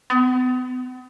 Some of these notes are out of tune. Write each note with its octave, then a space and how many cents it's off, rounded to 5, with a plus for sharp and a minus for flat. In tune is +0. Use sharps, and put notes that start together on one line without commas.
B3 +40